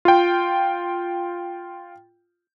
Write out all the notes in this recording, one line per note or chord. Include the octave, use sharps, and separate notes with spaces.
F4 G5